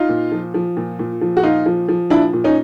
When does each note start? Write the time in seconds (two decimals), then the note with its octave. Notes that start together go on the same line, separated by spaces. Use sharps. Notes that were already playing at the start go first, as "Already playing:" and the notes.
Already playing: D#4 F4
0.09 A#2
0.32 F3
0.54 F3
0.77 A#2
0.99 A#2
1.21 F3
1.37 F#4
1.43 A#2 D#4 F4
1.66 F3
1.89 F3
2.10 A#2 D4 E4
2.33 A#2
2.44 C#4 D#4